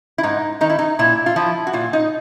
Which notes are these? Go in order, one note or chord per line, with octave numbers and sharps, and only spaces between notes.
E4
G#2 D#4
D#3 D#4
E4
D#4
A#2 E4
F4
F3 E4
F#4
A#2 F4
D#4